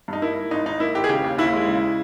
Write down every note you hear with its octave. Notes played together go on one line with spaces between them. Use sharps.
G2 D#4
A#3 E4
A#3
G#1 D#4
G#1 D#4
A#3 E4
G#1 G4
G#4
C#3 G4
D#2
D#2 E4
G#3
C#3